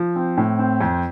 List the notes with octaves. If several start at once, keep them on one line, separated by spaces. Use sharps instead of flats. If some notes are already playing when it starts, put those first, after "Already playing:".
Already playing: F3
C4
A2
C4
F2